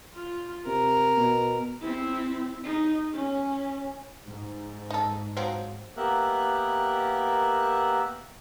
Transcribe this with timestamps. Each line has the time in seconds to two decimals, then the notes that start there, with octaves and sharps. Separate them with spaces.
0.15 F4
0.66 C3 A#4
1.17 B2
1.81 C4 E4
2.64 D#4
3.13 C#4
4.27 G#2
4.91 D#4 A4
5.37 F3 F#3 C4
5.97 A#3 B3 G4 A#4 E5 F#6